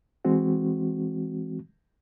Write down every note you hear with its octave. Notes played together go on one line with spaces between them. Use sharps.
E3 G#3 C4 F#4